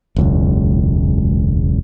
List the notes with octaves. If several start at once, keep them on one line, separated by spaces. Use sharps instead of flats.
E1 C#2 F#2